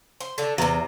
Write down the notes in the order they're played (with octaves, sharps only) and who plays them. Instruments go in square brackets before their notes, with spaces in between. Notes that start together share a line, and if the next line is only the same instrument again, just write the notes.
[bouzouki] C5
D3 A4
[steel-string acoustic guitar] E2 [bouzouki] C3 A#5